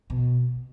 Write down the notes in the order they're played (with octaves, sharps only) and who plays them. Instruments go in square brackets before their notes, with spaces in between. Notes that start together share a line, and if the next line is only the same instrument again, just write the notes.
[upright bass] B2